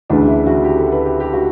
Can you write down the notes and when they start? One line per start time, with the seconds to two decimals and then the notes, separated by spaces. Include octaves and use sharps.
0.10 D2 C#3 E3 D4
0.27 E4
0.46 F#4
0.64 G4
0.78 A4
0.92 B4
1.05 G4
1.20 G4
1.33 F#4